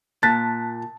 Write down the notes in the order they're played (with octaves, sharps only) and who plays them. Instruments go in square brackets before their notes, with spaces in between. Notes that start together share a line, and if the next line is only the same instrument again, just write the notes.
[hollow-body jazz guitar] A#2 [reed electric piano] A5 [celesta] F#6 B6 [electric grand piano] A6